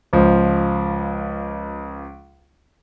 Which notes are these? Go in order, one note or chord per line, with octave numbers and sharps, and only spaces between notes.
C#2 F3